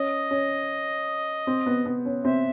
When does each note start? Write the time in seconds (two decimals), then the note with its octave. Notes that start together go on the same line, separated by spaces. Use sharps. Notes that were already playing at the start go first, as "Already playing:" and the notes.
Already playing: C#4 D#5
0.31 C#4
1.47 C4
1.66 B3
1.86 B3
2.05 C#4
2.24 C4 E5